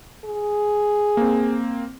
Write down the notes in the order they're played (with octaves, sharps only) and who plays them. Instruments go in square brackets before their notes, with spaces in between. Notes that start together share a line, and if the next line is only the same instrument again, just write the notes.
[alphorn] G#4
[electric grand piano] A#3 C4